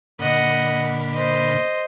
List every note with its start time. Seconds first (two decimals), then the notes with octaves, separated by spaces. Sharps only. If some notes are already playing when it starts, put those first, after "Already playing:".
0.19 A#2 D3 D#5 F#5 B5
1.14 C5 D#5